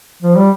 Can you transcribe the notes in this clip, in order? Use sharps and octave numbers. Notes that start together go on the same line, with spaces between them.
F3
G3